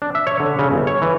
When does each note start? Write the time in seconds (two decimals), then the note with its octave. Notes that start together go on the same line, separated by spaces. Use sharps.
0.02 D4
0.15 E5
0.27 C#5
0.40 D3
0.59 C#3
0.72 G1
0.87 C#5
1.02 E3